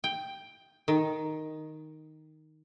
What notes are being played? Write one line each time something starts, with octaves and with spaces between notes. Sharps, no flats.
G5
D#3